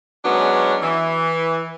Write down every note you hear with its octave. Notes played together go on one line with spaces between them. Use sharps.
F#3 G#3 B3 C#4 D4
E3